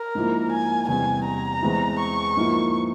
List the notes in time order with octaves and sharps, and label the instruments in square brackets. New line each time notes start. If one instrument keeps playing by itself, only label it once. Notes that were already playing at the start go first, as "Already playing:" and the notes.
Already playing: [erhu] A#4
[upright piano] G#2 F3 A#3 E4
[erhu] G#5
[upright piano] E2 C3 G3 [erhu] G#5
[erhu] A#5
[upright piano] E2 E3 G#3 C4 E4
[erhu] C#6
[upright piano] G#2 F3 A#3 E4